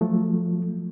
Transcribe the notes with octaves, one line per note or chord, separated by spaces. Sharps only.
F3 F#3 A3